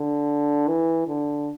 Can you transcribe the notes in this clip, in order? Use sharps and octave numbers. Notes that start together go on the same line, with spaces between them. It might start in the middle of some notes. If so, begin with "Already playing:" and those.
Already playing: D3
E3
D3